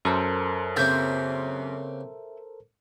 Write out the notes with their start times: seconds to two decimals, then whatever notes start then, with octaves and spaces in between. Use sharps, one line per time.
0.05 F#2 A4 A#4 C5
0.76 C#3 A#3 C4 E5 G6